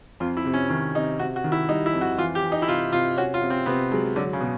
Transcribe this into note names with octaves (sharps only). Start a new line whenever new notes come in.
F2 F4
E4
C3
C#4
D#3 C#4
C3 D#4
C3 F#4
F#4
D#3
E4
G3 D#4
E4
F2
F#4
E3 F4
G4
E3
D#4
E4
C3 F4
C3 F4
C#4 F#4
F4
C3
C4
C3 B3
F#3 G#3
D3 F#3
C#3
B2